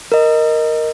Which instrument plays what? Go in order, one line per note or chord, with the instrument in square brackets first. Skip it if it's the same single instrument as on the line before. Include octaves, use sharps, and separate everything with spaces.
[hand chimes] A#4 D#5